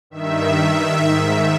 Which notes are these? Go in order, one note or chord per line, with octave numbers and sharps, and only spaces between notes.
G2 D#3 E5
G#2 D#3